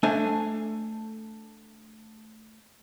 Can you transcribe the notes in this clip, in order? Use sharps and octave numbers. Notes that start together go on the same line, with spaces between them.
A3 D4 C5 F5 G#5